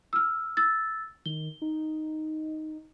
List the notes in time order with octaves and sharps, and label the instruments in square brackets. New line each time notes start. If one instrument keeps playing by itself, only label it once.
[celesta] E6 F6
E6 A6
[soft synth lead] D#3 [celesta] G7
[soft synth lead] D#4